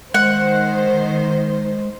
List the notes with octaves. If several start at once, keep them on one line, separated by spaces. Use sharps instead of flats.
D#3 G#3 C5 F#5